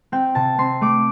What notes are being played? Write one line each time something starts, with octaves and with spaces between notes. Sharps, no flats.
C4 G5
C3 A5
C4 C6
A3 D6